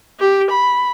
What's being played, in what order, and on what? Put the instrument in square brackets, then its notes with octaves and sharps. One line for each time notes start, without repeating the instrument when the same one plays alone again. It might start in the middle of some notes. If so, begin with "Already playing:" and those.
[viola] G4
B5